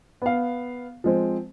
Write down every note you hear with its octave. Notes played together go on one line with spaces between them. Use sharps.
B3 F5
F3 G#3 C4